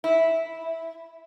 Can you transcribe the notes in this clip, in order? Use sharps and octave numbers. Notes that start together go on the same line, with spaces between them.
E4